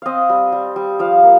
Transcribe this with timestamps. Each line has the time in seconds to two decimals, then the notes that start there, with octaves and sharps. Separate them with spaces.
0.02 C4 D#5 F5
0.29 G3
0.52 G3
0.76 G3
0.99 F3 F5
1.23 A#3